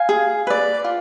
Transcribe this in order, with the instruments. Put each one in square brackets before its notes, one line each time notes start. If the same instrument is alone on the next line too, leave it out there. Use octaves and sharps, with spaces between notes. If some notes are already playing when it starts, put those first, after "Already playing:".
Already playing: [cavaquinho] F5 G#5
G#4
B4 D5
F4